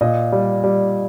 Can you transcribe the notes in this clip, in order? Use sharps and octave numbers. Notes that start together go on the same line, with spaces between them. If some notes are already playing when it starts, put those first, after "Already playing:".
A#2 D#5
G3
G3